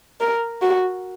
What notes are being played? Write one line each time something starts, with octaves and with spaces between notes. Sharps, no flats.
A#4
F#4